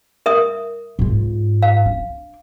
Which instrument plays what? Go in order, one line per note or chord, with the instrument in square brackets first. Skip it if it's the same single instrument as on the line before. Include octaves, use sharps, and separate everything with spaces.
[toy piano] A#4 E5 D#6
[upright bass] G#2 F4
[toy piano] F5
[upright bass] D4